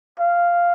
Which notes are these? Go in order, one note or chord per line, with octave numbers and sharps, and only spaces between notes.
F5